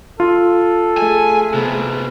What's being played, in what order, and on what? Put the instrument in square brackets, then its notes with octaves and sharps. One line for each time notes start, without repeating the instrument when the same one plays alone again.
[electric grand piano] F4 [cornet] A4
[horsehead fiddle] A3 G#4 [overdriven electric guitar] G#5
[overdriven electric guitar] C3 B3